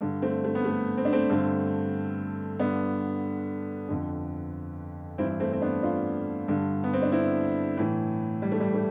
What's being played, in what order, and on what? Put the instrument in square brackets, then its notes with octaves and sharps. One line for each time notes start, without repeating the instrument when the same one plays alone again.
[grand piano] G2 D3
A3 C4
A3
B3
A3
C4
D4
A3 C4
G2 D3 A3 C4
G2 D3 B3 D4
F2 D3
G2 E3 C4 E4
A3 C4
C4
B3 D4
D4 F4
G2 D3
B3
C4
D4
C4 E4
A2 E3
G3
A3
G3
A3